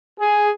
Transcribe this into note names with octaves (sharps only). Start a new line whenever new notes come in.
G#4